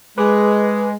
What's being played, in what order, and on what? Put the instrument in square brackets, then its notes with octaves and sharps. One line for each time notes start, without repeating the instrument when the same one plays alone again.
[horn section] G#3 [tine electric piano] B4 D6